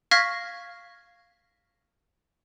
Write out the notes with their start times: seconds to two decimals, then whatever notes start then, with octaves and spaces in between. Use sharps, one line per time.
0.11 F5 C#6 F6 G#6 A#6 B6